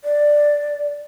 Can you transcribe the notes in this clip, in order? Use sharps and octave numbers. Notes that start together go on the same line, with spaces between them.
D5